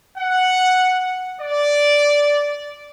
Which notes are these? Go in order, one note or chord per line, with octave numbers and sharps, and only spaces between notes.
F#5
D5